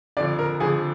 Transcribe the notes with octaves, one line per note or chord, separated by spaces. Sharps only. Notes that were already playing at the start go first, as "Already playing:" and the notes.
F2 D3 F3 D5
A#4
F2 D3 F3 G#4